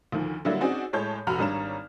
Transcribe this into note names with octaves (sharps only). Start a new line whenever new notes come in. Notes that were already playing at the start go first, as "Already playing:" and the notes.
D2 D#3 F3
D3 F#3 G3 A#3 E4 F#4
C4 C#4 D#4 F#4 G#4 D5
A2 G#3 C#5 A5 G6
F1 F#4 A#5 B5 F6
G#1 G3 D4 C#5 A#5 E7